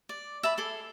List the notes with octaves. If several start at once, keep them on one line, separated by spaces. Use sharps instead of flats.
D5
E5 A5 B5
G#4 A4 D6